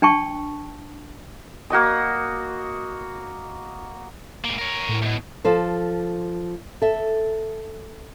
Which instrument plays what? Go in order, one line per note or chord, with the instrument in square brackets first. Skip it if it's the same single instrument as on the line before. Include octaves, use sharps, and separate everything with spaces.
[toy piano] D4 G5 A5 C#6
[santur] A#3 F#4 D#5 D#6
[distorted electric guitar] G#2 A#3
A#4 C#5
[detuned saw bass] A2
[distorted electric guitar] D2 B2
[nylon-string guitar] F3 A4 C5
A4 E5